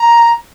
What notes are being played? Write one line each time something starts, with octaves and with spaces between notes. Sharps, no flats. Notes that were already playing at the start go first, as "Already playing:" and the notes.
Already playing: A#5